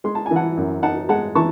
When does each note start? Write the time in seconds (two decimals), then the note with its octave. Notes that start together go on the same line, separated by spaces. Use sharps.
0.04 G#3 C6
0.15 A5
0.26 E3 G#5
0.36 F#5 A5
0.57 F#2
0.83 D#4 F#5 A5
1.09 G#3 F#5 A5
1.35 E3 A5 C#6